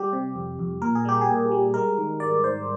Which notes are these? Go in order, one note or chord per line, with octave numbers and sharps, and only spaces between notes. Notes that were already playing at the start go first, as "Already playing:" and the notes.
Already playing: G3 G4
C3
F2
F2
A#2 A#4
G#4
G3 G4
G#4
A#2
G3
G#3 A#4
D#3
G#2 D5
G#2 C5